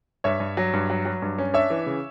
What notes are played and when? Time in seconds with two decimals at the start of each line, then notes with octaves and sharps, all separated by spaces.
0.24 G2 C#5 E5
0.40 G2
0.57 F#3
0.73 G2
0.90 F#3
1.05 F#3
1.22 G2
1.38 C#4
1.54 D4 C#5 E5
1.70 E3
1.86 C#3